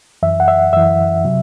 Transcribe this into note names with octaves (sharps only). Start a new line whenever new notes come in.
F#2 E3 E5
F#5
E5
F#2 E3 E5
C3 F#3